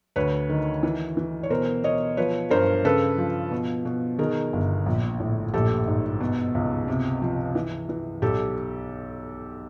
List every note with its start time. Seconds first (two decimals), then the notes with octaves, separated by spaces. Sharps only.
0.16 D2 B4 C#5
0.49 D#3
0.83 E3
1.17 E3
1.43 C#5
1.50 B2 A#4 C5
1.84 B2 C#5 D#5
2.17 F3 B4 C#5
2.50 G2 A#4 C5
2.85 C#3 A4 B4
3.18 F3
3.51 B2
3.85 B2
4.19 D#3 G#4 A#4
4.53 G1
4.86 A#1
5.20 A2
5.53 A#1 G4 A4
5.87 G#2
6.20 B2
6.55 C#2
6.88 C3
7.22 F3
7.55 E3
7.89 E3
8.22 B1 G4 A4